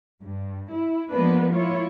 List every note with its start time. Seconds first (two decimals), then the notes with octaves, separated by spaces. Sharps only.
0.21 G2
0.70 E4
1.10 F3 G#3 A#3 B3 D4 B4
1.53 A#3 E4 F4 C#5